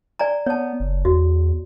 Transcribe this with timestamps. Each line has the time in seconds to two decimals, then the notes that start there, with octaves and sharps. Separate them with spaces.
0.19 D5 G#5 A#5
0.46 B3 C#5 A5
0.80 F#1
1.05 E2 F#4